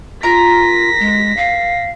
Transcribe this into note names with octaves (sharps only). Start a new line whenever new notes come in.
F4 A#4 A#5 A#6 B6
G#3
F5